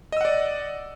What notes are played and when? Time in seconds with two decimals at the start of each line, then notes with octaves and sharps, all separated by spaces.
0.12 D#5
0.17 E6
0.21 F#5
0.25 D5